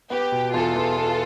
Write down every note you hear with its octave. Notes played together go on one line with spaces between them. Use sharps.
B3 G4
B2
E2 F4 A4
E2
B3